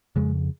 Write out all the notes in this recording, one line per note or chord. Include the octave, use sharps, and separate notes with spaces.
F2 C#3 G#3